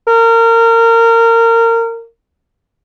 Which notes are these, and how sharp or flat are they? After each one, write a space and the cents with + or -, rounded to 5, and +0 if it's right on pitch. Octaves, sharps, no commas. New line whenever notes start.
A#4 -25